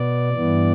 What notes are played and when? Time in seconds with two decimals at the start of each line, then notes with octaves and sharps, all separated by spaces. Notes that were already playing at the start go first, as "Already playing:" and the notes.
Already playing: B2 B3 D5
0.34 G2 E3 B3